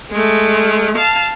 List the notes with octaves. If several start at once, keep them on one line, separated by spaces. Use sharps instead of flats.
G#3 A3
F5 A5